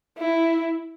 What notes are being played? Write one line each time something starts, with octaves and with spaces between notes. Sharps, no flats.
E4